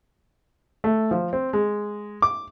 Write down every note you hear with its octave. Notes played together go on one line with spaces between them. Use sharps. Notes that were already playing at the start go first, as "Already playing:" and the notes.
A3
F3
C4
G#3
D6